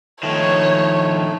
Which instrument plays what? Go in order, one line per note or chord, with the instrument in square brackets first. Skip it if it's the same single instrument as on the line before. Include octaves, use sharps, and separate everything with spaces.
[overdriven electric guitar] D#3 F3 [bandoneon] A3 [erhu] C#5